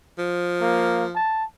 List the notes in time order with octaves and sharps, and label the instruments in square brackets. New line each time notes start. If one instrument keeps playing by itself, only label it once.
[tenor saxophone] F3
[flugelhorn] A#3
A5